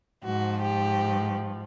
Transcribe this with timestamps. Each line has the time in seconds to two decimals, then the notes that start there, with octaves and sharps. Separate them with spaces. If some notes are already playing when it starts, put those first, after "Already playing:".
0.24 G#2 F3 F#4
0.62 G4